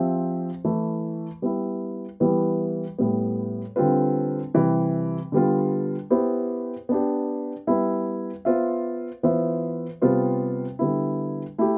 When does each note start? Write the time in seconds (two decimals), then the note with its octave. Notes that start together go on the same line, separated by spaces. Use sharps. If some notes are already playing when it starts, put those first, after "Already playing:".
Already playing: F3 C4 G4 C5 E5
0.65 E3 A3 E4
1.42 G3 B3 E4
2.20 E3 G3 B3 E4 B4
2.98 A2 G3 B3
3.76 D3 G3 C4 F4 B4
4.54 C3 E3 G3
5.32 D3 G3 B3 F4
6.10 B3 E4 G4 C5
6.89 B3 D4 G4
7.67 G3 B3 E4 B4 E5
8.45 B3 F4 C5 E5
9.23 E3 B3 F4 C5 E5
10.02 C3 G3 B3 F4 C5
10.79 D3 G3 B3 E4
11.58 A3 E4 G4